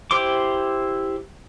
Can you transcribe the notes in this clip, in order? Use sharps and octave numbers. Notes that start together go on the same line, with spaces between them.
E4 G4 C5 C6 D6